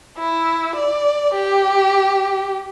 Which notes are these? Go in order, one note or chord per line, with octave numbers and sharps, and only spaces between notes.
E4
D5
G4